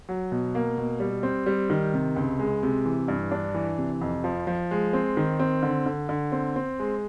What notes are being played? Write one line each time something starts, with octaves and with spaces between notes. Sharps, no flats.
F#3
B2
A#3
B2
G3
C4
G3
D#3
C3
C#2
G#3
C3
E3
G2
D4
E3
C3
F2
F3
F3
G#3
C4
D#3
C4
D3
D3
D3
C4
C4
G#3